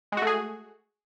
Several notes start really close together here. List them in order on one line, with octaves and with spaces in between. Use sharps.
G#3 F#4 A3 G#4